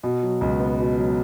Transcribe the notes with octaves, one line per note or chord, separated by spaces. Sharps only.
B2
F#3
C#2
B3
B2
F#3